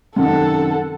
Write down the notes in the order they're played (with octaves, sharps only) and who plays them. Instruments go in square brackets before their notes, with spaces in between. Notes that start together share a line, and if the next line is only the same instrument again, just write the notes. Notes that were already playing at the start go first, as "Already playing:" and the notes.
[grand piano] F#2 C3 D#3 [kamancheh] A4 F#5